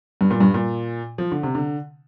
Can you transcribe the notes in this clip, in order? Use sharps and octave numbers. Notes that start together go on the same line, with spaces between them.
G2
A#2
G2
A#2
F3
D3
C3
D3